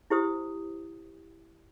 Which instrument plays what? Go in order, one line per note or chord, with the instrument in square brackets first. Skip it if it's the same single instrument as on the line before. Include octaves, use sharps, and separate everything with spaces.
[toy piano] E4 G4 C5 D#6